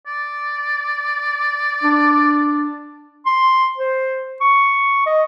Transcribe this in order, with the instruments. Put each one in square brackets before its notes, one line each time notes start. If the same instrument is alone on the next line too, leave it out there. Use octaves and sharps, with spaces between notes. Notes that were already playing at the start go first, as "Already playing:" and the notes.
[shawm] D5
[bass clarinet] D4
[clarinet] C6
C5
C#6
D#5